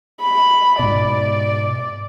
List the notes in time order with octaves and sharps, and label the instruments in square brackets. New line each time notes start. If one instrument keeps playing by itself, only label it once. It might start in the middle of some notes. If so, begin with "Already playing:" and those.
[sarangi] B5
[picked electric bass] G#2 B2 [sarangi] D5